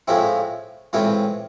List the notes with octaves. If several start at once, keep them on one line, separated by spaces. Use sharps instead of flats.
A2 F3 G#3 C4 E4
A2 E3 G#3 C4 F4